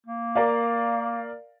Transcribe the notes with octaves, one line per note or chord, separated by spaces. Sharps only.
A#3
A#4 D5 F5